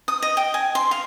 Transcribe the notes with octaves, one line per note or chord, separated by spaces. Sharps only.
D#6
D#5
G5
G#5
C6
F5